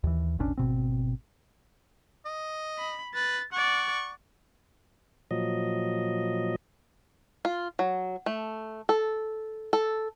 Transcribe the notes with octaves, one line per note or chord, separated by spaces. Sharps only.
D#2 E3
E1 A1 C#4 D4
G#1 B2 C4
D#5
B5
B4 A6
D5 F#5 C#6
A#2 F3 F#3 D#5
F4
F#3
A3
A4
A4